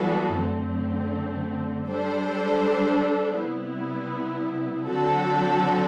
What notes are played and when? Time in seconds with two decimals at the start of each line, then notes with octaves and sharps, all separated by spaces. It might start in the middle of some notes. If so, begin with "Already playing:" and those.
Already playing: E3 G3 B3 F#4 A4
0.38 F#2 D3 A3 C4
1.88 G3 D4 A4 C5
3.37 C3 G3 B3 E4
4.87 D3 F#3 C4 F#4 A4